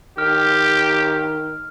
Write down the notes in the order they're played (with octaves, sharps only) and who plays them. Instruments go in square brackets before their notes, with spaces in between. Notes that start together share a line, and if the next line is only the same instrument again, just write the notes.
[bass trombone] D#3 [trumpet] G4 [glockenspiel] F6